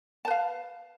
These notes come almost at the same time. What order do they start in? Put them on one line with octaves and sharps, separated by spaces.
A5 B4 F5